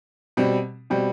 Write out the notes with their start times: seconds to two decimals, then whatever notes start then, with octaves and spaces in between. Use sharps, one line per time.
0.37 B2 G3 C4
0.90 B2 G3 C4